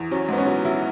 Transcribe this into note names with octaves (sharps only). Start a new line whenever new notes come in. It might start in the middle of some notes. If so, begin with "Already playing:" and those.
Already playing: E2
F#3 C#4
G#2 B3
C#4
F#3
F#3 E4